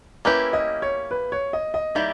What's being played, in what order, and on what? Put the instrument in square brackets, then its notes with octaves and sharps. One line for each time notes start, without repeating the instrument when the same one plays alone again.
[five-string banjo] A#3 C#4 E4 G4 [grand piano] B4
[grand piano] D#5
C#5
B4
C#5
D#5
D#5
[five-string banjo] D#3 G3 A#3 E4 G4 [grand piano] E5